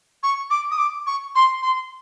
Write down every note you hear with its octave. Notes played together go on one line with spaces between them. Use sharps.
C#6
D6
D#6
D6
C#6
C6
C6